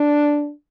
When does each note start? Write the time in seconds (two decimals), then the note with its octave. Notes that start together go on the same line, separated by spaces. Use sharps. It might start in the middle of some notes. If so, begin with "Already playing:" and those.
Already playing: D4